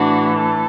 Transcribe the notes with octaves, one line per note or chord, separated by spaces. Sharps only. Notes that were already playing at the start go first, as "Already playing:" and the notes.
Already playing: A2 E3 D4 F#4
A4